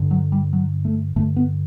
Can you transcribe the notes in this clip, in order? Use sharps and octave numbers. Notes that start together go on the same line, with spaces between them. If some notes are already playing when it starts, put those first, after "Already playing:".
Already playing: G2 D3
F#3
G3
F#3
A3
G2 D3 A3
B3